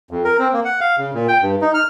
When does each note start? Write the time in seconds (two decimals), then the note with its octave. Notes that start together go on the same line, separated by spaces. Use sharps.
0.11 F2
0.24 A#4
0.39 C4
0.53 A#3
0.65 F#5
0.81 F5
0.98 C#3
1.14 A#2
1.28 G5
1.42 G2
1.62 D#4
1.74 F6